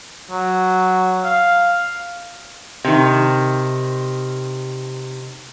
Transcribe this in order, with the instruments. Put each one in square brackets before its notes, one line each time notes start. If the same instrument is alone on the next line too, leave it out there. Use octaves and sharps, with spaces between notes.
[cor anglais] F#3
F5
[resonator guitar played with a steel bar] C3 D#3